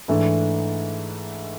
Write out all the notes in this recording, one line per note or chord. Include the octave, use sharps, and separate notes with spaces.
G#2 E3 A3 D4